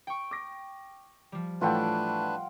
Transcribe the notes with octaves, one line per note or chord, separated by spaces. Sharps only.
G5 C#6
D6 A#6
F3 G3
A2 E3 A3 D4 F4 B4 F#5 G5